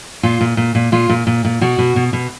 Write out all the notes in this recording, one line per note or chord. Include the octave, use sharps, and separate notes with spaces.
A#2 F4
A#2
A#2
A#2
A#2 F4
A#2
A#2
A#2
B2 F#4
B2
B2
B2